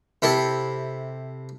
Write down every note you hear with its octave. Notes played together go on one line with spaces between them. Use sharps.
C3 E4 A4